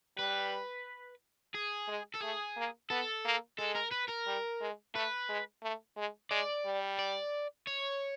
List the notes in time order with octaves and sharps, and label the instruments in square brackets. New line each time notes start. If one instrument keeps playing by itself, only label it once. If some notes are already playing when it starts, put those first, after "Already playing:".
[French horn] G3 [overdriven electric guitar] B4
[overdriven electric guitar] G#4
[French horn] G#3
[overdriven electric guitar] A4
[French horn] A3 [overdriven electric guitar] G#4
[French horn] A#3
[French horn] B3 [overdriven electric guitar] A4
[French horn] A#3
[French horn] G#3 [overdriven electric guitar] A4
[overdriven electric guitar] A#4
B4
A#4
[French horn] G3
G#3
[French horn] A3 [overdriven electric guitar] B4
[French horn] G#3
A3
G#3
[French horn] G#3 [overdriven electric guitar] D5
[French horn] G3
[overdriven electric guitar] D5
C#5